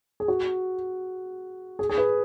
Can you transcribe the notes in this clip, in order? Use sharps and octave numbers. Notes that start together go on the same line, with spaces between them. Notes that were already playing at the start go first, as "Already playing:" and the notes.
G#4
F#4
G#4
G#4
B4